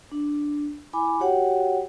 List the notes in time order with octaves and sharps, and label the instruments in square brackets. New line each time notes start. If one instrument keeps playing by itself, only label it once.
[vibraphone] D4
E4 G#5 B5 D6
F#4 G4 C#5 F#5 G5